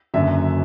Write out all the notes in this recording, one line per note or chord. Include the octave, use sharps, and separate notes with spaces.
F#1 F#2 D3 F#3 E5